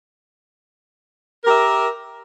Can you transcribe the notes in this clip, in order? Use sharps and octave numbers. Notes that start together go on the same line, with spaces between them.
G4 A#4 E5